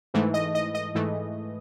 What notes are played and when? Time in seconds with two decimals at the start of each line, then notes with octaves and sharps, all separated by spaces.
0.14 G#2 E3 A3
0.34 D#5
0.55 D#5
0.75 D#5
0.95 G#2 E3 A3